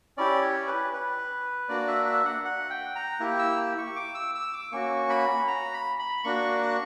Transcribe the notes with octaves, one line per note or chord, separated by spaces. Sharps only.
C#4 E4 G4 D5
C#5
B4
B4
A#3 D4 F#4 D5
E5
E5
F#5
F#5
G5
A#5
A#3 E4 G4
E6
C#6
D6
E6
E6
D6
A#3 C#4 F#4 C#6
B5
A#5
B5
B5
A#3 D4 F#4 C#6